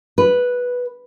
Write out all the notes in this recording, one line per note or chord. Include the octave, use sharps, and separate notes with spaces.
B4